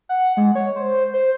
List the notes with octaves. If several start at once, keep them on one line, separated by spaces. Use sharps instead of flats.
F#5
G#3
C#5
C5
C5